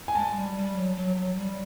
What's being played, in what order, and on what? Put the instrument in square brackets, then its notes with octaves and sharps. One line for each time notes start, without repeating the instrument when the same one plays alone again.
[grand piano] G#5
[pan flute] G#3 [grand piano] A5
[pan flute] G3
G3
F#3
F#3
F#3
G3